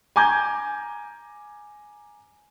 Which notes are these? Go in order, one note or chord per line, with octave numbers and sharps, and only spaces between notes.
G#5 A#5 D6 G6 G#6